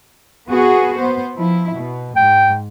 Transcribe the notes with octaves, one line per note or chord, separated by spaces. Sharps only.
B3 F#4 G#4
B3 C5
F3 E4
B2
G#2 G5